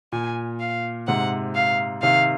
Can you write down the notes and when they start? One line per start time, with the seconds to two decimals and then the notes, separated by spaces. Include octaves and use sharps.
0.12 A#2 G#5
0.60 F5
1.08 G#2 C3 F#5
1.55 F5
2.02 C3 D#3 F5